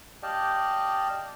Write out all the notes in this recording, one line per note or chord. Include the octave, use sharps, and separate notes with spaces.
G4 D5 D#5 F5 G5 A5